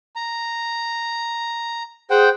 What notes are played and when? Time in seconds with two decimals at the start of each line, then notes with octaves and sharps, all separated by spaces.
0.16 A#5
2.10 G#4 C5 F#5 G5